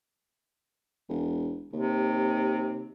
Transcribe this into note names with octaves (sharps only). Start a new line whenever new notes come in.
E1
D#2 C3